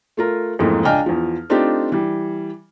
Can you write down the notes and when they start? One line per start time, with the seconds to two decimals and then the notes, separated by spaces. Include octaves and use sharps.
0.17 A3 F4 A#4
0.59 F2 G#2 E3 A3 A#3
0.85 C#2 D4 D#5 G5 G#5 F6
1.06 E2 F3
1.49 A3 C4 D4 D#4 F4 G4
1.92 E3 G3